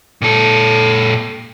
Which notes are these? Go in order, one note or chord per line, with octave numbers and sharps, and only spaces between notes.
A#2 A4